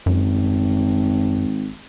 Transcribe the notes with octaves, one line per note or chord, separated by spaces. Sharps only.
G#1 F#2